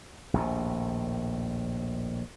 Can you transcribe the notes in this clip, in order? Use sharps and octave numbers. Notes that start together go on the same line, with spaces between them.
A#1 D#2 A2